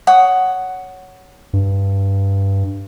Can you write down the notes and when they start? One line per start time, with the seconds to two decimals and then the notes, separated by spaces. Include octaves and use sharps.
0.07 C#5 F#5 D#6
1.53 G2